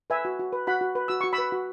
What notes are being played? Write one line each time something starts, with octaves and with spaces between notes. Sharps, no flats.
B4 E5 G#5
F#4
F#4
B4
F#4 F#5 B5
F#4
B4
F#4 E6
F#4 C#6
B5 E6
B4
F#4